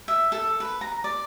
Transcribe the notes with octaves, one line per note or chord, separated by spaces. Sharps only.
E5
A4
B4
A#5
D5